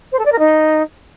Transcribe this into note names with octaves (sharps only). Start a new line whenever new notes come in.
C5
A4
D5
A#4
D#4